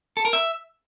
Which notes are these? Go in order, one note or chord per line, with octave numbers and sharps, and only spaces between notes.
A4
A#4
E5